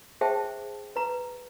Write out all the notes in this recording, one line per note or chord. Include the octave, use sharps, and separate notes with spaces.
G#4 C5 E5 G5 A5
B4 A#5